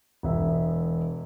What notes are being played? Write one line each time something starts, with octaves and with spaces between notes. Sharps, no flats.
E1 E5